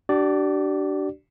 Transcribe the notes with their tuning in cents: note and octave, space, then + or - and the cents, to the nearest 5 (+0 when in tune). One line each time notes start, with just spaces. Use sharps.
D4 +0 G4 -45 D5 +0